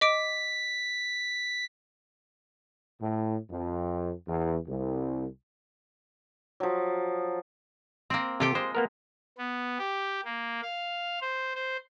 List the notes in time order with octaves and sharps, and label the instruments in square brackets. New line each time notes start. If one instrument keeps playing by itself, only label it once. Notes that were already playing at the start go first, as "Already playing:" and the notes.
[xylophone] D#5 D6 D7 [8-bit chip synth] B6
[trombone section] A2
F2
E2
C2
[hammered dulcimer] F3 F#3
[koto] A#3 C4
[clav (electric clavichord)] C3 A4 [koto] F4 G4 G5
[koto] G#3 [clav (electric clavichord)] C5
[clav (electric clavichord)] A#3 B3 A#4
[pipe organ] B3
G4
A#3
F5
C5
C5